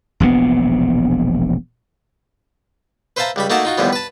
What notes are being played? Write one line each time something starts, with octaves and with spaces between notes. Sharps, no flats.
E1 A#1 C3 B3
B4 C5 E5 F5 A5 A#5
C#2 G3 B5
A3 A#3 D#4 F#4 F#5 A5
D#4 F4 F#4
D#2 A2 D3 F3 G3 B3
B4 A5